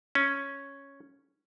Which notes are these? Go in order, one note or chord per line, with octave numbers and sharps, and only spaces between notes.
C#4